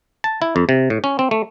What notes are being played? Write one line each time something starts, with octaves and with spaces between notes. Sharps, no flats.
A5
E4
F2
C3
A2
C#4
C4
A3